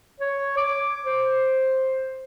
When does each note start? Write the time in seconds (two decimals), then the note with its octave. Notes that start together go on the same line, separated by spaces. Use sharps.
0.20 C#5
0.57 D6
1.05 C5